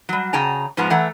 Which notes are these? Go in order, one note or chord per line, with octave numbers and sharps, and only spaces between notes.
F#3 G3
C#3 G#4 G5 A5 A#5
G#2 F3 G#3 B3 A5 A#5
E3 A3 F#5 A#5